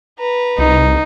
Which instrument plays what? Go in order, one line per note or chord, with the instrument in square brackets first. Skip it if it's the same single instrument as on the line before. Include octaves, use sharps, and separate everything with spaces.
[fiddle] B4 A#5
[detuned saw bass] C2 [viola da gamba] D#4